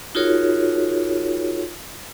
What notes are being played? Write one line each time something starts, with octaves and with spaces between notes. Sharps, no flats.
D#4 F4 F#4 G#4 A#4 C#5